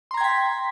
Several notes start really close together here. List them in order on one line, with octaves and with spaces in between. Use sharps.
C6 A#5 G#6 G5 B6